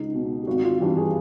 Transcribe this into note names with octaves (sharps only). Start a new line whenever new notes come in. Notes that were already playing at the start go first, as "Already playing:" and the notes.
Already playing: C#2 D#4
B2
G4
G#1 F#4
F#4
F4
G2 E3 G4
G#4